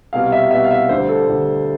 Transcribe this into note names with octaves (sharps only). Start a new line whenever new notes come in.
C2 B2 G3 F5
E5
C2 B2 G3 E5
F5
E5
D2 D3 G3 C5
A4
D2 D3 G3